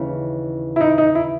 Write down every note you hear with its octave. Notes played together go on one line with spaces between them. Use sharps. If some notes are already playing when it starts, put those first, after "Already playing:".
Already playing: D#2 C#3 E3
E4
D#4
D#4
E4